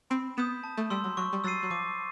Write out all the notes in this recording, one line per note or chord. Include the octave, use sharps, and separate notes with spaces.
C4 B5
B3 D#6 G6 B6 E7
A5
A3
G3 C6 E6
F#3
F#3 C#6
G3
F#3 E6 A6 C7 D#7
F#3
F3 D6